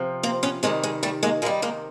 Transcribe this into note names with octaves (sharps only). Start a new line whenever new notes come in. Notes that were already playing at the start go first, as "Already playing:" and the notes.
Already playing: C3 F3
A#3 C4
B3 C#4
C3 D#3 G3 G#3
G#3
G3 A3
G#3 A#3
C3 D#3 G3 G#3 A#3
G#3 A#3